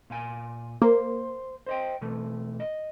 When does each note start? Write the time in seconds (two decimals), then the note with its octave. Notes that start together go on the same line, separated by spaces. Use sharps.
0.10 A#2 F5 G#5
0.82 A#3 C5
1.66 C5 D#5 G5
2.01 B2 E3 A3
2.60 D#5